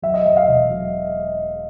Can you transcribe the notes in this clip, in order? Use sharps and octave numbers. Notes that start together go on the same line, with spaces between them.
F#3 E5
D#5
F#3 E5
D#5 F5
E1 E5
F#3